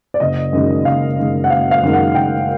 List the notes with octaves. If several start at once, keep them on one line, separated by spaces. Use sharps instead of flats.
D5
F#1 D#5
F#2 D#3 G#3
F#1 F5
F#2 D#3 G#3
F#5
F#1 F5
F5
F#2 D#3 G#3
F#5
F#1 G5